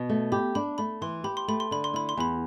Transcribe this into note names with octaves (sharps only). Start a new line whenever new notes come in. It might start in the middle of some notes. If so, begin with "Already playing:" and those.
Already playing: B2
A3
G4 B5
D4 B5
A3 B5
E3 C6
G4 B5
C6
A3 B5
C6
D3 B5
C6
E4 B5
C6
E2 B5